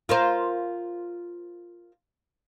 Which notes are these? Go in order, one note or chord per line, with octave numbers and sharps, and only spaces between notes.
F4 A#4 C5